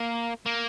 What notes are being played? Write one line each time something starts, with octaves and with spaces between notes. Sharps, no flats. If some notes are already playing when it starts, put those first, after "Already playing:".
Already playing: A#3
A#3